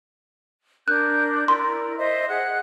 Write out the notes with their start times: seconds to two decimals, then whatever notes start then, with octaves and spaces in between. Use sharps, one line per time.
0.88 D4 A#4 F#6 G6
1.48 E4 A#4 D5 C6
1.97 C5 D#5 E5
2.29 G#4 F#5 F#6